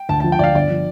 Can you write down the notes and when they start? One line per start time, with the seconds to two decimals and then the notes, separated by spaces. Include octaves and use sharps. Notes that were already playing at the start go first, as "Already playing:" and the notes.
Already playing: G5
0.09 D2 A5
0.20 F3 A5
0.32 G5
0.39 D2 D5
0.44 F5
0.55 G1 D5
0.70 F3